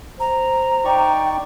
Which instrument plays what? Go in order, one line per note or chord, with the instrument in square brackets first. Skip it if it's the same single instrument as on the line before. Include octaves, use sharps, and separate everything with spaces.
[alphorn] C5 [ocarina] A#5
[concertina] D#4 D5 C#6 [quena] G5